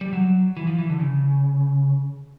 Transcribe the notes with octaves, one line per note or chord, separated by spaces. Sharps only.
G3
F#3
E3
F3
E3
D3
C#3